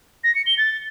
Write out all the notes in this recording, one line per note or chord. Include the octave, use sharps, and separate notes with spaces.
A#6
C#7
G7
A6